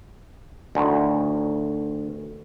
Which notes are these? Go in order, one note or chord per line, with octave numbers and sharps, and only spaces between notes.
D2 A2 D#3